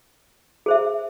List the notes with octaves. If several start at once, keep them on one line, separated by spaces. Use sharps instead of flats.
G#4 C5 E5